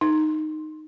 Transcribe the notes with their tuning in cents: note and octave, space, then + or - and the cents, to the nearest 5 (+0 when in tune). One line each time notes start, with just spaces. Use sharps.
D#4 -10